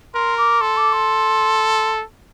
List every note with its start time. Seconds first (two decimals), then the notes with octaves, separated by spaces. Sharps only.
0.14 A#4 C6
0.38 D6
0.61 A4 C6
0.77 D6
0.92 C6